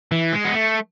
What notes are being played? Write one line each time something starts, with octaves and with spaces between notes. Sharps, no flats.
E3
G#3
B3
A3